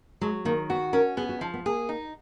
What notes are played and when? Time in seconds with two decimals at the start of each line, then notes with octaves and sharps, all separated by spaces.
0.21 F#3 G#3
0.45 D#3 A#3
0.70 B3 F#4
0.93 C#4 A#4
1.17 B3 G#4
1.29 F#4
1.41 F3 D#4
1.54 B3
1.66 A#3 G#4
1.89 D#4